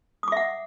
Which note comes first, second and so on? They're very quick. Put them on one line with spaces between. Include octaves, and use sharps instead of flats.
D#6 D6 E5 F#5